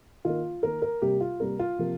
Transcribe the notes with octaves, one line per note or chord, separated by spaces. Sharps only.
D#3 A#3 F4
D#3 A#3 A#4
A#4
C3 G3 A#3 G4
F4
C3 G3 A#3 A#4
F4
C3 F3 A#3